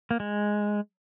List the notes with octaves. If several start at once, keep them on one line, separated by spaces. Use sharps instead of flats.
A#3
G#3